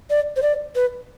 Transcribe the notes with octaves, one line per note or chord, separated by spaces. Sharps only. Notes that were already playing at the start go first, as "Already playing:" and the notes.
D5
C5
D5
B4